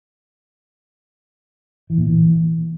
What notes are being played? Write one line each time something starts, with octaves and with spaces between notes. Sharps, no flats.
E3
A#2
E3